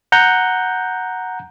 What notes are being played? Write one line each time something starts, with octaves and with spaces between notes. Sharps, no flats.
F#5 A#5 G6